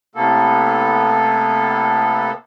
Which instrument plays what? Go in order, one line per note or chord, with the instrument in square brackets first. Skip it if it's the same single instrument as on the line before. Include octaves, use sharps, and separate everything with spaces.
[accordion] A2 C3 A#3 B3 A4